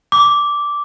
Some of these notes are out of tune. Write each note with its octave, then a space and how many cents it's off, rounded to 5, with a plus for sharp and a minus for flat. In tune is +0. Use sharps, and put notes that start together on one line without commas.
D6 -10